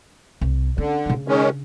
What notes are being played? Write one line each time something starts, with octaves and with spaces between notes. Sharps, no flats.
C2
D3 C#4
C#3 D4
D#3 G#3 C#4